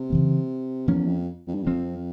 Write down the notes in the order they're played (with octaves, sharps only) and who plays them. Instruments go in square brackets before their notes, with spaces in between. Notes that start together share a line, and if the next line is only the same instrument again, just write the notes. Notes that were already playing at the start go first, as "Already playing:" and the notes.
Already playing: [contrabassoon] C3
[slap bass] C#3 E3 A#3
[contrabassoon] E2 [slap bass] F3 A#3 C#4
[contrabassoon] F2
F2
G2
[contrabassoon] F2 [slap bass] F3 C4